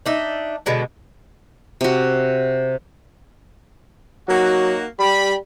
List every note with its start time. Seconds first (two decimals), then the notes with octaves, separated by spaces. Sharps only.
0.06 D4 D#4 E5
0.66 B2 D3 G#3 B3
1.81 C3 F#4
4.29 F#3 A#3 D#4 F#4
4.99 G3 G4 B5